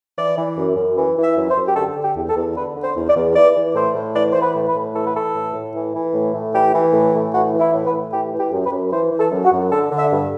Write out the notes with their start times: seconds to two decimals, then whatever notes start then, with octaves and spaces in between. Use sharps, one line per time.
0.17 E3 D5
0.37 E3
0.57 F#2
0.76 F#2
0.97 E3
1.17 E3
1.23 E5
1.36 F#2
1.50 C5
1.57 F#2
1.67 G4
1.76 D3 A4
1.96 D3
2.03 G4
2.16 E2
2.30 A4
2.36 E2
2.56 D3 B4
2.75 D3
2.83 C5
2.95 E2
3.09 D5
3.16 E2
3.36 E3 D5
3.55 E3
3.75 A2 C5
3.95 A2
4.15 E3 D5
4.33 E3 C5
4.42 B4
4.55 A2
4.68 B4
4.75 A2
4.94 E3 A4
5.05 B4
5.14 E3 A4
5.34 A2
5.54 A2
5.74 E3
5.94 E3
6.14 A2
6.34 A2
6.53 E3 G4
6.73 E3
6.93 A2
7.13 A2
7.32 E3 F#4
7.53 E3
7.60 E4
7.73 A2
7.86 B4
7.93 A2
8.12 E3 G4
8.32 E3
8.39 G4
8.52 F#2
8.65 B4
8.72 F#2
8.92 E3 C5
9.11 E3
9.18 A4
9.31 F#2
9.45 F#4
9.52 F#2
9.71 D3 A4
9.91 D3
9.98 E5
10.11 G2